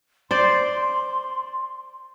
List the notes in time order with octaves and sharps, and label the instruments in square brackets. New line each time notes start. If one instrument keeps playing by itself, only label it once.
[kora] C5 D5 [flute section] C6